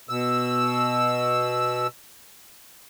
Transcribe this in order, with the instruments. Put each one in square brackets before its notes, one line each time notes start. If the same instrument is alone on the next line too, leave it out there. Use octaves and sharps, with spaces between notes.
[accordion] B2 E6